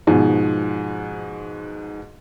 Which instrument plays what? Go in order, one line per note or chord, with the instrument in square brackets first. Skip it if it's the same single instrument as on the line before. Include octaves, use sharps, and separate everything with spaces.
[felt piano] G#2 B2 F3